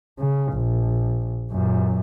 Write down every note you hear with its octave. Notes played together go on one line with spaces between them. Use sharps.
C#3
A#1
F#2 A#2